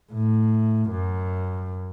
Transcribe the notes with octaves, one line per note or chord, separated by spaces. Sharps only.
A2
F#2